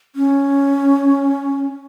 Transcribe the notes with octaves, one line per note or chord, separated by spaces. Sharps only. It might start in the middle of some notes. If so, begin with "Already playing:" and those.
C#4